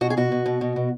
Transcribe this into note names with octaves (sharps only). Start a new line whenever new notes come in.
B2 F#4
G#4
B2 F#4
B2
B2
B2
B2